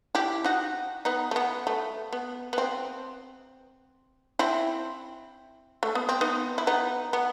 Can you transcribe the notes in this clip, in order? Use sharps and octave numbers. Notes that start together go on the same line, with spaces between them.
E4 G4
D#4 F#4
B3 D#4
A3
B3
A3
B3
B3
C4
C4 E4
A3
B3
C4
B3 D#4
E4
B3 D#4
B3